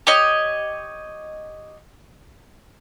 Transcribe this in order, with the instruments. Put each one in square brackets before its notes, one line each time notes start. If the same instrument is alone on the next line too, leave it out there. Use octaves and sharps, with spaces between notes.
[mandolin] G4 C#5 D#5